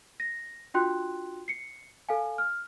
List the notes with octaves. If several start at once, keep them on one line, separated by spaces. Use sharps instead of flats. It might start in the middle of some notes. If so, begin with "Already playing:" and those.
A#6
D4 F4 F#4 G5 C6 F#6
C7 C#7
A4 F5 G#5
F6